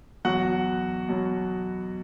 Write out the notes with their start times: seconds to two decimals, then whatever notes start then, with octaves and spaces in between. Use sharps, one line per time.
0.25 E2 B2 F#3 F#4 F#5
1.08 B2 F#3